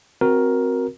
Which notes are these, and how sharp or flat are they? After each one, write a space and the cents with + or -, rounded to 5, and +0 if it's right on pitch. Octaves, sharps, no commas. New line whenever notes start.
C4 +0 F#4 +0 A#4 +10